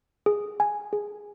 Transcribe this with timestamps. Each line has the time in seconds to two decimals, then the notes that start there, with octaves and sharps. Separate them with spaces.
0.26 G#4
0.60 G#5
0.93 G#4